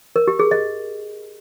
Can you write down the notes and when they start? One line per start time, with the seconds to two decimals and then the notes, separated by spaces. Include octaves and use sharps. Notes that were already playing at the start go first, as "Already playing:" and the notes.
0.16 A#4
0.28 G4
0.39 G#4
0.51 D#5